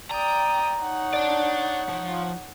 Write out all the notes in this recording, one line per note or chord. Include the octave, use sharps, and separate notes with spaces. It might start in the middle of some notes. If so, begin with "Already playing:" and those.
D5 G5 A#5 D#6
D#4 C#5 F#5
D5 A5
F3